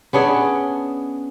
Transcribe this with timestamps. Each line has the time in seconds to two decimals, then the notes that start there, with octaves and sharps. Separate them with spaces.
0.13 B3 C#4 D4 G#4